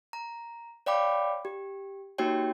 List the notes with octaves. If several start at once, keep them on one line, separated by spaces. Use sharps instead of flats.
A#5
C#5 D5 F5 G5 B5 D6
G4
A#3 D#4 F#4 G4 C#5 G5